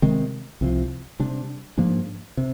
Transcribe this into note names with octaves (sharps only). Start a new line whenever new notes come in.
C3 D#3 G#3 C4
C2 C3 F3
C3 G3 D4
G#2 F3 A#3 D4
C3